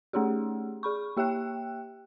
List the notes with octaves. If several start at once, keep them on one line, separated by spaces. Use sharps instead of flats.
A3 C#4 D#4 G4 G#4
G#4 B5 C#6
A#3 G4 E5 G5 F#6